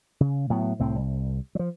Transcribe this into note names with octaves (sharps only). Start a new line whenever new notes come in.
C#3
A2 F#3 B3
C2 A2 C4
C2
F3 F#3